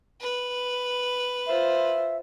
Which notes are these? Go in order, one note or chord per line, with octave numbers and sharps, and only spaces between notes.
B4
F4 C5 E5